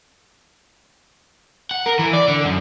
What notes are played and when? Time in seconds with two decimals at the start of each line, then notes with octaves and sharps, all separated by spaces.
1.71 F#5
1.86 A#4
1.99 E3
2.13 D5
2.28 D3
2.45 F#2